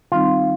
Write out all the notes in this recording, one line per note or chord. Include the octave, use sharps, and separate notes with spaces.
D#3 G3 C4 D#4 F4